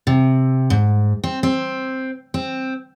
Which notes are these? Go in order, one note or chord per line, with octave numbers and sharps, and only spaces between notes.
C3
G#2
C4
C4
C4